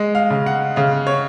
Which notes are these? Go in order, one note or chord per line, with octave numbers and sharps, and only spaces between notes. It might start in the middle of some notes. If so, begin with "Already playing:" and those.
Already playing: G#3 D#5
F5
C#3
F#5
C#3 F5
C#5